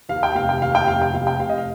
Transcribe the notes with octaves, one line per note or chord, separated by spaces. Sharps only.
D#2 F5
G5
F1 F5
G5
D#2 F5
G5
F1 F5
G5
F1 F5
G5
F1 F5
D#5
F5